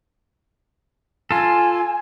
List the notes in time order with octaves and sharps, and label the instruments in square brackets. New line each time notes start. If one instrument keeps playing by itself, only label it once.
[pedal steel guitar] F4 A4 [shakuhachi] G#5